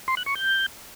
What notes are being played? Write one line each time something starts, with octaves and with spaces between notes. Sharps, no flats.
C6
F#6
C#6
G6